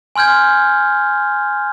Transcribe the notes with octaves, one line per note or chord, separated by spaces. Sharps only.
G#5 C6 F6 G6 G#6